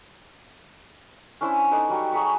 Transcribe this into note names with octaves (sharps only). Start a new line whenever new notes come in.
C#4 D4 E4 C5
D#4 A4 B4 D5
F#3 G3 G5 C#6
F#3 G#4 B5 C#6